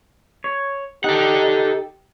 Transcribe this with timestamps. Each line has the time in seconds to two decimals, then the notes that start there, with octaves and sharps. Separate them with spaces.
0.44 C#5
1.04 D#4 G4 A4 F#5